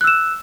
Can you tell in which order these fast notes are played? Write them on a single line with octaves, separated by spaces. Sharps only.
F#6 E6 E7